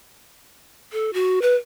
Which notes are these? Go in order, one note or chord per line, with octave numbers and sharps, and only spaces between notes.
A4
F#4
B4